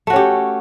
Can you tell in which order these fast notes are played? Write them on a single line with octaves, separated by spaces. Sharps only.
A3 F#4 C#4 G4